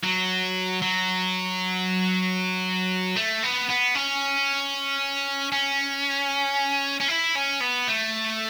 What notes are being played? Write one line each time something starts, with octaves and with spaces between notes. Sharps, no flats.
F#3
F#3
A3
B3
B3
C#4
C#4
C#4
E4
C#4
B3
A3